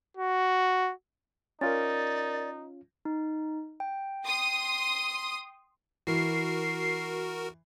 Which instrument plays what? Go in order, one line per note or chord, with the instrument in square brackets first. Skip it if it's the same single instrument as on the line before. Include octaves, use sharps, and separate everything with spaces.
[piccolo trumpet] F#4
[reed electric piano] C#4 F4 [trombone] D#4 [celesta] A#4 A6 [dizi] D5
[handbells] D#4
G5
[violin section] C6 D#6
[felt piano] E3 [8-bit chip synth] F#4 A#4 [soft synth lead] C7